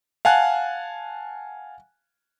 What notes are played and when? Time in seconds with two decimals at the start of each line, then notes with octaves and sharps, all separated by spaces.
0.25 F5 F#5 G#5 A5 F#6